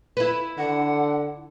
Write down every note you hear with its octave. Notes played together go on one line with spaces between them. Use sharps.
E4 B4
D3 F#5